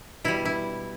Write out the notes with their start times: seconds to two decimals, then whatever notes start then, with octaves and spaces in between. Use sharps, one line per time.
0.24 B2 G3 E4
0.45 E4